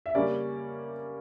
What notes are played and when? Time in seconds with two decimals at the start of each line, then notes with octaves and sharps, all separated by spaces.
0.06 E5
0.15 C#3 G3 A#3 C#4 D5